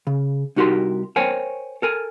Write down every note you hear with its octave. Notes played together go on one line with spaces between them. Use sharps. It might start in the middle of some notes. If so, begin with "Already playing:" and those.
C#3
C2 D#4 F#4 G4 A#4 C6
A#4 C5 C#5 G5 G#5
A4 A#4 G#5